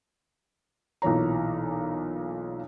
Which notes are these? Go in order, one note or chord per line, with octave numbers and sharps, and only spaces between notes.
B1 A#2 E3 C#5 A#5